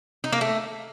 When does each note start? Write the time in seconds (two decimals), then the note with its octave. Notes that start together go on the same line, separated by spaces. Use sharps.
0.24 D#4
0.32 A#3
0.41 A3